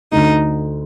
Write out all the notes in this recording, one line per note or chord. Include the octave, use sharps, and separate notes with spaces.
D2 D3 A3 D#4